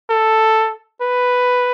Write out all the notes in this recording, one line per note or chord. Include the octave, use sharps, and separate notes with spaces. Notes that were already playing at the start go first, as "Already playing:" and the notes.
A4
B4